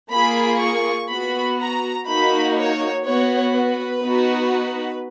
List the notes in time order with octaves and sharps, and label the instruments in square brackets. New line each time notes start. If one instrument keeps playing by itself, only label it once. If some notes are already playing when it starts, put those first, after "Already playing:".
[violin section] A#3 F4 G#4 B5
C#6
B3 F#4 B5
A#5
A#3 D#4 F#4 B5
C#5
B3 F#4 C#5
B4
B3 D#4 F#4